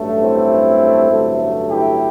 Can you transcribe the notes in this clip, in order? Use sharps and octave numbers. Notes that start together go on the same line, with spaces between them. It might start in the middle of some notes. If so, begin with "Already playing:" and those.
Already playing: A1 G2 F#3 A3
C4 E4
A1 G2 D3 F#3 A3
E4 G4